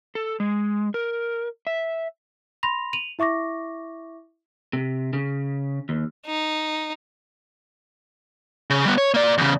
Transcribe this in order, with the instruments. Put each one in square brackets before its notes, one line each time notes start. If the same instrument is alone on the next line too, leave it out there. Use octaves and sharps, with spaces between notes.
[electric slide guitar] A4
G#3
A#4
E5
[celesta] B5 C6 A#6 F7
D#7 F7 F#7
E4 E5 C#6 D6 A#6
[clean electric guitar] C3
C#3
D#2
[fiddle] D#4
[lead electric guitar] C#3
G3 B3
C#5
A#3 D5
E2 C#3